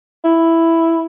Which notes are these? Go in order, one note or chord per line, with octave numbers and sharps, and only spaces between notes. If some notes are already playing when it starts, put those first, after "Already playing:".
E4